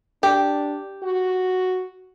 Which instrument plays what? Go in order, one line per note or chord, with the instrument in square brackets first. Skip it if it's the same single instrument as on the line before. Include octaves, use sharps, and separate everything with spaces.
[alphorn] D4 [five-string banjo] G4
[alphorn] F#4